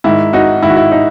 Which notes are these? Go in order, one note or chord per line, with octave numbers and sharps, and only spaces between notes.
G#2 D#3 E4
D#4 F#4
G#2 D#3 E4
F#4
E4
D#4